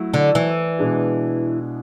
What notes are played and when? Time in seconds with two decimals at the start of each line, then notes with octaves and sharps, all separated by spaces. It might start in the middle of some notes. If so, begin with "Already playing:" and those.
Already playing: F#3 A3 E4
0.14 D3
0.35 E3
0.79 B2 G#3 D4 G#4